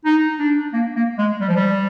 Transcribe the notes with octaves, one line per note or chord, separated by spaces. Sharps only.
D#4
D4
A#3
A#3
G#3
G3
F3
G3